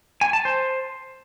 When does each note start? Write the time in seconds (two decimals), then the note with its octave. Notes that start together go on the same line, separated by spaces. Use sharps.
0.21 G#5
0.33 A5
0.45 C5